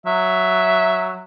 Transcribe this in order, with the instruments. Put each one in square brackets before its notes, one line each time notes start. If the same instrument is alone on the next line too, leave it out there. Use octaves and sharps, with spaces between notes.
[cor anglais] F#3 [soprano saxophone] E5